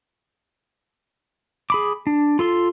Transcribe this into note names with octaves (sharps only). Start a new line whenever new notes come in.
G#4 B5 D6
D4
F4 A4 C6